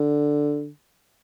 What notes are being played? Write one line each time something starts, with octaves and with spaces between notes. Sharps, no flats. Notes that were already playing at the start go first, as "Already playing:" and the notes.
Already playing: D3